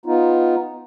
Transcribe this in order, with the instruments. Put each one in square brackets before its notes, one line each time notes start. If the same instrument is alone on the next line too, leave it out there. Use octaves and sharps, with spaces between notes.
[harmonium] B3 D#4 F4